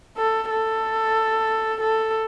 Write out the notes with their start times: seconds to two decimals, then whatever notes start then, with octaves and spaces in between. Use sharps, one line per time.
0.18 A4
0.51 A4
1.81 A4